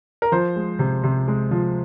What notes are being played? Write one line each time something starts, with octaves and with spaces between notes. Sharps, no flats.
A#4
F3 C5
G#3
C3
C3
G#3
F3